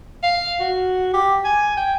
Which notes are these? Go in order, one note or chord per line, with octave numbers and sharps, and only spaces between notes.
F5
F#4
G4
G#5
G5